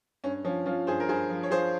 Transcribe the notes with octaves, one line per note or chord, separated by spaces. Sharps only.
G2 C#4
F3 C#4
F3 C#4 F4
G2 G#4 C5
A#4
G2 G#4 C5
F3
C#5
F3 G#4 C5